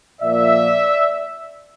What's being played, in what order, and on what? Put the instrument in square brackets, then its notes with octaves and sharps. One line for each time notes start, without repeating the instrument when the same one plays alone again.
[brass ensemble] A#2 F3 A#3 D5 E5